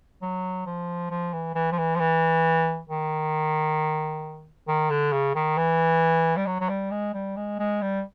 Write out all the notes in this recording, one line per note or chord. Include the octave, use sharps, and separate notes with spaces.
F#3
F3
F3
E3
E3
F3
E3
F3
E3
D#3
D#3
D3
C#3
D#3
E3
G3
F#3
F#3
G3
G#3
G3
G#3
G#3
G3